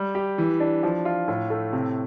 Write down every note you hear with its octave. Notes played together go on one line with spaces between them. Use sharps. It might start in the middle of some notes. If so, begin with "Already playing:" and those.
Already playing: G3
G4
E3
D4
F3
F4
A2
A3
C3